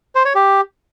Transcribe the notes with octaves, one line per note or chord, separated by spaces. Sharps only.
C5
C#5
G4